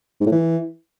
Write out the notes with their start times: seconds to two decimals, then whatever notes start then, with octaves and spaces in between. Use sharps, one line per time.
0.20 G#2
0.26 A2
0.31 E3